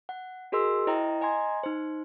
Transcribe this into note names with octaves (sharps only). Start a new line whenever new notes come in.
F#5
F#4 G#4 A#4 D#5 C6 E6
E4 C5 D#5 G5 A#5
D#5 G#5 A#5 C6 G#6
D#4 C5